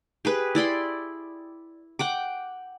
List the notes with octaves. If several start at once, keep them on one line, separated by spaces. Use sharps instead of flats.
G4 G#4 B4
E4 D5 B5 C6
F#5 G5 D6